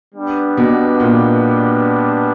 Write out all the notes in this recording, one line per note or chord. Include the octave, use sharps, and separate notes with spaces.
G3 B3 D4
B2
A#2